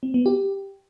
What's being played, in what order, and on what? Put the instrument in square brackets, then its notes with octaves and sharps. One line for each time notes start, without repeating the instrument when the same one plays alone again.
[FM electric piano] C4
B3
G4